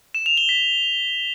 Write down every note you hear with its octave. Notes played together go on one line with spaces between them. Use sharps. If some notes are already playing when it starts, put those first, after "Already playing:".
E7
F7
G7
B6